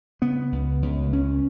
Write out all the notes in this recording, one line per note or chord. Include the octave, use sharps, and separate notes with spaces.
C#3 B3
C#2
C#2
C#2 C#4